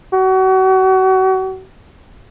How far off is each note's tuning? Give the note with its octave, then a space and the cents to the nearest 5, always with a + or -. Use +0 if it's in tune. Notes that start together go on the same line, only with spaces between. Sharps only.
F#4 +35